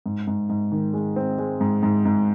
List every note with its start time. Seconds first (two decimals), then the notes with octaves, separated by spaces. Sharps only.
0.06 G#2
0.27 G#2
0.49 G#2
0.72 D#3
0.93 G#3
1.16 C4
1.38 G#3
1.61 G#2
1.83 G#2
2.06 G#2